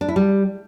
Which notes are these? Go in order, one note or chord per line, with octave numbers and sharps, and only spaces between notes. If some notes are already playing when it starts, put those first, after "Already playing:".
D4
E4
G3